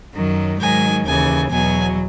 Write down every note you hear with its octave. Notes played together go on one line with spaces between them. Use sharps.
F#2 D#3 F#3
G#2 D#3 F#3 G#5
D#2 C#3 E3 G#5
E2 B2 F#3 G#5